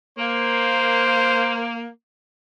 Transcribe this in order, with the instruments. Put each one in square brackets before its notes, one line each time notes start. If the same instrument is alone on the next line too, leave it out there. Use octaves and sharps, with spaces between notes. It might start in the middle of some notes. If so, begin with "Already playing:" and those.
[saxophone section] A#3 [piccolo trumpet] C5